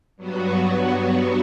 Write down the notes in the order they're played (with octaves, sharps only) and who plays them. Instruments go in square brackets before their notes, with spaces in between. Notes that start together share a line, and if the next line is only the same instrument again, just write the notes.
[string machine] G2 F#3 B3 F#4